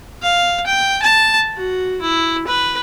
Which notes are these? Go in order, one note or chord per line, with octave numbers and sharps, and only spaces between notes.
F5
G5
A5
F#4
E4
B4